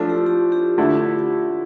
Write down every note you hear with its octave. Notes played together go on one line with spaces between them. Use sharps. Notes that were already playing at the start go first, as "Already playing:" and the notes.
Already playing: F3 A3 D4 E4 F4
G4
G4
G4
D3 A3 E4